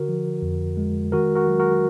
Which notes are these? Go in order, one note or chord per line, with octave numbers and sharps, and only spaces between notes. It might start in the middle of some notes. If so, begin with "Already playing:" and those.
Already playing: D3 F#4 A#4
F3
F2
G#3
D#3 F#4 A#4
F#4 A#4
F#3
F#4 A#4